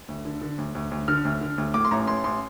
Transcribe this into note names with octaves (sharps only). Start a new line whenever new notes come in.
D2
D3
D3
D2
D2
D2
D3 F6
D2
D3
D2
A2 D6
C6
A1 A#5
A1 C6
A1 C6